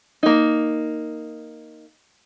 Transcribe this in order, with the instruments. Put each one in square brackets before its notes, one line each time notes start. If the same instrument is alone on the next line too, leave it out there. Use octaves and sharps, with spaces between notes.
[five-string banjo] A#3 D#4